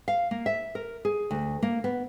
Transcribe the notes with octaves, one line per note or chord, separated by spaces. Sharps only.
F5
A#3
E5
A#4
G#4
D2
A#3
B3